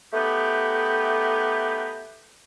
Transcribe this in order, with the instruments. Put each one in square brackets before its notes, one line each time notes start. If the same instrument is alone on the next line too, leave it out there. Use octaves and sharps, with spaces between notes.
[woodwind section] A3 B3 D#4 G4